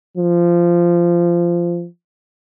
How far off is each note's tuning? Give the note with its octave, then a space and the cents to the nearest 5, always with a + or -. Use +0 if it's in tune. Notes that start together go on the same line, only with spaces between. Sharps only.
F3 -15